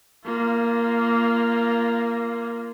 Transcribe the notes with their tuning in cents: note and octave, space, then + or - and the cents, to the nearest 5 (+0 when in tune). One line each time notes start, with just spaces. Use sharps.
A#3 +0 F4 -25